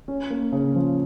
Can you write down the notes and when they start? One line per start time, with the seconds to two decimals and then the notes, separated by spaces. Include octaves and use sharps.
0.08 C#4
0.30 A#3
0.52 C#3
0.75 F3